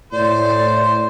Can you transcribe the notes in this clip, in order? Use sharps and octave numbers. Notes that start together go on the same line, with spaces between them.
A2 C5 D5